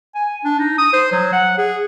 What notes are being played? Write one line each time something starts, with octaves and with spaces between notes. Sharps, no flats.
G#5
D4
D#4
D#6
C5
F#3
F#5
G#4